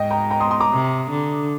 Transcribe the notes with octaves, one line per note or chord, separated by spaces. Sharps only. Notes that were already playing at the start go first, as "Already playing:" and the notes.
Already playing: G#2 D#5 G5
G5 A#5
G5 A#5
C6 D#6
C6 D#6
A#5 D6
C3
D3